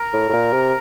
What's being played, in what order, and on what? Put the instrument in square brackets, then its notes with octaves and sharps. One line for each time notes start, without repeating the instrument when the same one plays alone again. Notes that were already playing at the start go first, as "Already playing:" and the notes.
Already playing: [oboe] A#4
[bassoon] A2
A2
A#2
C3